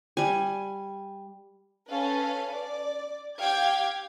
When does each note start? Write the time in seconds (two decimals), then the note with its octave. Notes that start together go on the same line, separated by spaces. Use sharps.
0.17 G3 G#5
1.89 C#4 A4 B4 F5
2.52 D5
3.39 G4 F5 G5 G#6